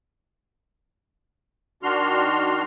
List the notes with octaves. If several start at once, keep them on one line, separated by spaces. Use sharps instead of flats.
D#3 D4 F#4 C6 F6